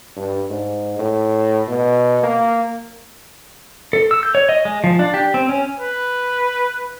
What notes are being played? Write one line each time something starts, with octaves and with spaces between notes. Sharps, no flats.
G2
G#2
A2
B2
A#3
A4
E6
G6
C#5
D#5
G#3
F3
D4
G4
C4
C#4
B4